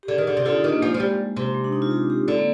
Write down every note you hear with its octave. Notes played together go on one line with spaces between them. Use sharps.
G4
D3 G#4
D#3
D3 G4
C3
D3 F4
D#4
D#3 D4
A#3
F3 G#3
F3
G3
C3
G#3
D4
D#4
F4
G4
G4
D3
A#3